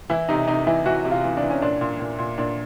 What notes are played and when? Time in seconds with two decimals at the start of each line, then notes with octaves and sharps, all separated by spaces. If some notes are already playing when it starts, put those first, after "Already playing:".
0.10 E3 E4
0.29 C3 D#4
0.48 C3 D#4
0.67 E3 E4
0.85 E3 F#4
1.05 C3
1.11 F4
1.24 E3
1.37 D4
1.43 E3
1.50 C#4
1.61 A#2 D4
1.81 A#2
2.00 A#2
2.18 A#2
2.38 A#2 D4